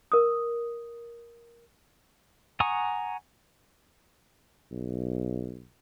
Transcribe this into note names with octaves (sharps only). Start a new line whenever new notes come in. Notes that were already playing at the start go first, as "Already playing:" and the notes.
A#4 D#6
F#5 G#5 A#5 C#6 D#6
B1